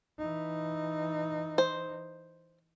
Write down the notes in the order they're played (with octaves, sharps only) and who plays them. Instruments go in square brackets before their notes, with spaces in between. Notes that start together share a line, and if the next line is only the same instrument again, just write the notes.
[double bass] E3 D#4
[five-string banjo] C5